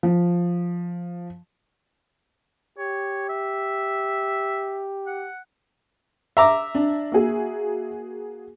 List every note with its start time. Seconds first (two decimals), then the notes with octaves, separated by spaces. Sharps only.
0.03 F3
2.78 G4 C#5
3.29 E5
5.07 F#5
6.37 E5 A#5 D6
6.75 D4
7.12 A#3 F#4 G#4